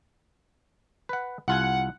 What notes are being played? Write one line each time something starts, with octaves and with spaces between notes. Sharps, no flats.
B4 F#5
C2 F4 F#5 G#5